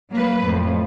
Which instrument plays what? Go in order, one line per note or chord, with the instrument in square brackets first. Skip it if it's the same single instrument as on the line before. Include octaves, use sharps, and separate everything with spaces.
[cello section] F#3 A#3 B4
F2 A2